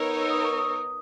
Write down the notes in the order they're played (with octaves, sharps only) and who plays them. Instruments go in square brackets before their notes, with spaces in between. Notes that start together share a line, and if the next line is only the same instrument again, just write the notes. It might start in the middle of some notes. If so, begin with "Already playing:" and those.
Already playing: [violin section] B3 D#4 A#4 C#5 [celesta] E6
[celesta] E6
D#6
C#6
D#6